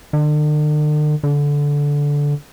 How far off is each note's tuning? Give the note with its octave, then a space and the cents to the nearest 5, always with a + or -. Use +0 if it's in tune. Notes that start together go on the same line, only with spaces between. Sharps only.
D3 +45
D3 -15